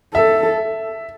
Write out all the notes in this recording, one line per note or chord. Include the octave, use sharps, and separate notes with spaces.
A4 E5